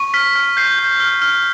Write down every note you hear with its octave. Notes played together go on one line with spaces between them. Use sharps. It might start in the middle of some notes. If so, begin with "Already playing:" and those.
Already playing: C#6
F6 B6
F6
G6 C7
G6
F6
F6